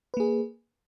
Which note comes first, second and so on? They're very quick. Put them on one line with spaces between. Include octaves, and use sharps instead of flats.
B4 A#3 G#4